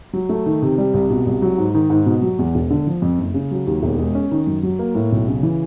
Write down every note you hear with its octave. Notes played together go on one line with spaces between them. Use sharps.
F#3
A3
D#3
C3
G3
C2
B2
C2
F#3
G#2
D#3
G#2
B2
F#3
E2
E1
D3
F3
F2
F#1
C#3
F#3
D#2
E1
G#3
C#4
D#3
F#2
F#3
A#3
A2
B1
C#3
E3